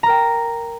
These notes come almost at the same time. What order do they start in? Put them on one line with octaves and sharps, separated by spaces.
A#5 A#4 G5